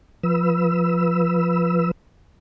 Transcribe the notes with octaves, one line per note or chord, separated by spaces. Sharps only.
F3 B4 E6